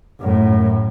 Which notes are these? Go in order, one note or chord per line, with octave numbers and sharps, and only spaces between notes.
F#2 A2